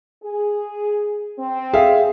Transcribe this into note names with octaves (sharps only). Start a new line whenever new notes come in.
G#4
C4
G#4 E5 F5